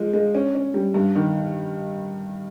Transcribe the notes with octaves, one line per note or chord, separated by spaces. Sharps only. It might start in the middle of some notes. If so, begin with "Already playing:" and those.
Already playing: F3 G#3
G#3
C#4
C#4
G3
G2
D#3